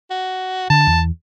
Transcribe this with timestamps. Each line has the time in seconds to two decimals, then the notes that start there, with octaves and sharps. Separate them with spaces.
0.10 F#4
0.70 D3 A5
0.87 E2